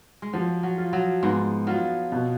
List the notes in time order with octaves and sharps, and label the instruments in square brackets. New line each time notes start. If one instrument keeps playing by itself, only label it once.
[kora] G#3
[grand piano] F3 [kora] F#3
[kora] F#3
[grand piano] F4
[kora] F#3
[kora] G#2 G#3 [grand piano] B3
[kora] F#3 [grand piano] F4
[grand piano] B2